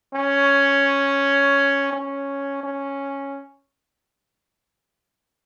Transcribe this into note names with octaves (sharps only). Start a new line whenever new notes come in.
C#4
C#4
C#4